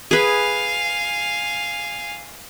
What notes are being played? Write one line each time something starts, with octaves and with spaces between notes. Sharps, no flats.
G#4 B4 F5 G#5